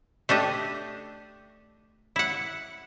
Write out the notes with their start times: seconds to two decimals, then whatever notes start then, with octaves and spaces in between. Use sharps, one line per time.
0.29 A3 D4 G4 D#5
2.16 E4 F#5